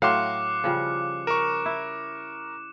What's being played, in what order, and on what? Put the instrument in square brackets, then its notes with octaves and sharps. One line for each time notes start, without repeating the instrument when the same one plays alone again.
[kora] A2 F#3 G5 [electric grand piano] F5 C6 [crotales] D6 F#6 C#7
[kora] C#3 F3 G3
[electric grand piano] A#4 C#6 [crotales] E7
[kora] E4